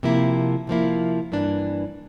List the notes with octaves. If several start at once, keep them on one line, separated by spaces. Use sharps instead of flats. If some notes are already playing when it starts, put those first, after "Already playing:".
C3 F3 A#3 E4
C3 F3 A#3 E4
G2 E3 A#3 D4